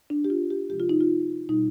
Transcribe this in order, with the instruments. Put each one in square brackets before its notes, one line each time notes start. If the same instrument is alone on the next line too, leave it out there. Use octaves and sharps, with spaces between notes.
[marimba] D4
G4
F4
G4
C3 F3 G#3 G4
F4
D#4
F4
B2 G3 D#4